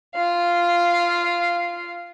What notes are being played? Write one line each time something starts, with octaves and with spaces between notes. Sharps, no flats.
F4 F5